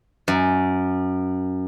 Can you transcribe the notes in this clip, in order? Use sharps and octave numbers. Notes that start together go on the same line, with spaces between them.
F#2